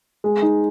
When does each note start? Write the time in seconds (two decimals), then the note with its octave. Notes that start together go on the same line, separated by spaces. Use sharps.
0.24 G#3
0.42 D#4